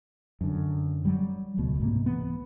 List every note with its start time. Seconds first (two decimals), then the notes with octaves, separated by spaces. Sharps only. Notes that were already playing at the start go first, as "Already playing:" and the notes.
0.41 F#2 D3
1.05 F#3 G3
1.57 D#1 C#2 B2 A3
1.80 C2 G#2 C3 A#3
2.06 E3 B3